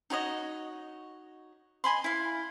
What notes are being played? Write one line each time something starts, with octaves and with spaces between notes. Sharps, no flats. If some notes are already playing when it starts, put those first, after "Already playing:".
D#4 F#4 C#5 D#5
D#5 G#5 B5 C6
E4 F5